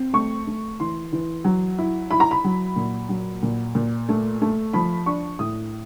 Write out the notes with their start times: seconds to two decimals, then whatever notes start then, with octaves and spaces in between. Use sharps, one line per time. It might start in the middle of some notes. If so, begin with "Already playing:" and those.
Already playing: C4
0.13 A3 C#6
0.47 A3
0.80 E3 C6
1.13 E3
1.45 F#3
1.79 E4
2.11 E4 B5
2.20 A#5
2.31 B5
2.44 F#3
2.76 A#2
3.09 F#3
3.43 A#2
3.75 A#2
4.09 A3
4.42 A3
4.73 F3 B5
5.06 D4 C#6
5.39 A2 D#6